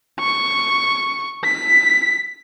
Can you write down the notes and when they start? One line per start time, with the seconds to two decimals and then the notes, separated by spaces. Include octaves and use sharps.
0.20 C#6
1.45 B6